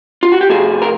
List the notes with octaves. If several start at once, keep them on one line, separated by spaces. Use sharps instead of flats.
F4
F#4
G4
C3 F3 A3 F#4 G#4
A#4